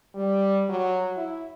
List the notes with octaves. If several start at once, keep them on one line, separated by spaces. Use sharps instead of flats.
G3
F#3
E4